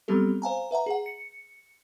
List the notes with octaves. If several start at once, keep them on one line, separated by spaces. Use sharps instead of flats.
F#3 G3 B3 C4 G4 A4
C5 F5 G#5 A#5
B4 E5 F#5 A#5
G#4 F#5
C#7